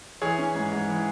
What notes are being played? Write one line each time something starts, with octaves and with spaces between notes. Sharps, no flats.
E3 G#4 C#5
C#4
G#2
G#2
E3